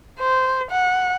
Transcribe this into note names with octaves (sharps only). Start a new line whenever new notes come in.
C5
F#5